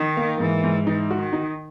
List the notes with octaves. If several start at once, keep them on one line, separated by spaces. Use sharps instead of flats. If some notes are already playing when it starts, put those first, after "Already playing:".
Already playing: D#3 D#4
A#3
G#2 E3
G#2
E3 D#4
F#4
D#3
D#4